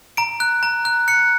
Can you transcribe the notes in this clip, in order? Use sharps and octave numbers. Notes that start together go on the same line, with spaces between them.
A#5 D7
F#6
A#5
F#6
F#6 C#7